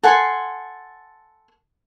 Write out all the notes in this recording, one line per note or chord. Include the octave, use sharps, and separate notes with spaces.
A4 F#5 G#5 C6